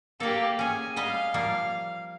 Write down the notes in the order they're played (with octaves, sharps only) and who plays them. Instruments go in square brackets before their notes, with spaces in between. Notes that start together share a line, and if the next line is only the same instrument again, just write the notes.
[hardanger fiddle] A#3 G4 [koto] A4 D5
[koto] C#4 G#4 [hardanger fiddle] G#5
[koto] G3 B4 D#5 [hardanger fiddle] F5
[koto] F3 G3 A#3